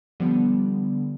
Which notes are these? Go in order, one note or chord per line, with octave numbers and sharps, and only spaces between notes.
D3 F3 G3 B3